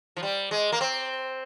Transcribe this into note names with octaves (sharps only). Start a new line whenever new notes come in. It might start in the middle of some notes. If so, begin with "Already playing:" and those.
F3
G3
G#3
A#3
C4